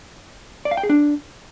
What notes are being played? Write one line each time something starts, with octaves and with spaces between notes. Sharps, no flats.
D5
F5
G5
G#4
D4